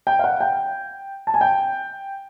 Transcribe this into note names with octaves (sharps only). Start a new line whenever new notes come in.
G5
F5
F#5
G5
A5
G#5
G5